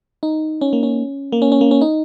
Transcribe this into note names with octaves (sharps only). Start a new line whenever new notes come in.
D#4
C#4
A#3
C#4
A#3
C#4
C#4
A#3
C#4
D#4